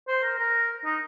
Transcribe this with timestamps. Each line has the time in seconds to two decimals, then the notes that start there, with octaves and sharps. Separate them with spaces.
0.08 C5
0.23 A#4
0.39 A#4
0.85 D#4